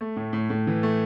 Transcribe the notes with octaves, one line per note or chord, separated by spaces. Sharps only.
A3
A2
A2
A2
E3
A3